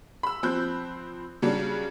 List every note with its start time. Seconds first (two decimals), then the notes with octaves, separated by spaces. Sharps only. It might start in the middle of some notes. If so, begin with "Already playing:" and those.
0.23 B5 E6
0.43 F3 C4 B5 F#6 G6
1.42 C#3 F#3 G3 D4